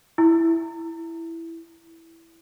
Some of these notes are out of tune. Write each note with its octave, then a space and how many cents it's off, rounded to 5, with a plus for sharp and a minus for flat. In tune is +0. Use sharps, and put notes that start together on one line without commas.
E4 +5